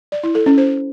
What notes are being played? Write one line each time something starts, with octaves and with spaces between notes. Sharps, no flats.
D5
E4
A4
C#4
C5